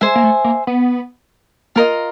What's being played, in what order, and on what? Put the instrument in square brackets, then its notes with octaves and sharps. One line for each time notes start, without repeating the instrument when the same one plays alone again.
[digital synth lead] G#3 [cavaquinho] C5 E5 G#5
[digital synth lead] A#3
A3
A#3
B3
[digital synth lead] A#3 [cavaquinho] F4 A#4 D#5